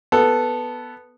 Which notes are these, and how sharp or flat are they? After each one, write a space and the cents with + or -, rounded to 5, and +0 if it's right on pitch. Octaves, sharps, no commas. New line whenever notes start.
B3 +0 A4 +0